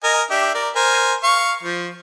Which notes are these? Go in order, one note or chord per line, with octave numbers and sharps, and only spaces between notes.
A#4 D#5 G#5
D4 G4 E5
A#4 D5
A#4 C5 G#5
F5 C#6
F3